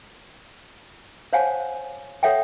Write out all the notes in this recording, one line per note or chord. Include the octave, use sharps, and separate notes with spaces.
C5 C#5 F5 F#5 G#5 A5
A4 C#5 E5 F#5 G5